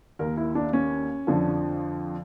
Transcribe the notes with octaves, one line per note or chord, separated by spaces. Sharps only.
D#2 D#3 A#4
E4
D4
C#4
F2 D3 F3